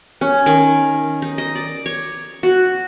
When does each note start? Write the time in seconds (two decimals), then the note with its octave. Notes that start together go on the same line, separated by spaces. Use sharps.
0.21 C#4
0.46 D#3
1.22 D#4
1.38 D#5
1.55 D5
1.86 C#5
2.43 F#4